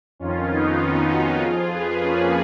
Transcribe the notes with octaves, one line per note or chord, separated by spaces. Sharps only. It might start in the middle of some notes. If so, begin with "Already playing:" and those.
F2 D#3 C#4 F4
B3 D#4
C#4 F4
D#4 F#4
F2 F3 F4 G#4
G#4 B4
A#3 C#4